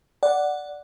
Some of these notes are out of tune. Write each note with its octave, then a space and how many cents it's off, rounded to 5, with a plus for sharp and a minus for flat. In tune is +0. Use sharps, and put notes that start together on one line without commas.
D5 +0 F#5 +0